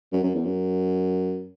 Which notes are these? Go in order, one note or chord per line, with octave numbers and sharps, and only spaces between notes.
F#2
F#2
E2
F#2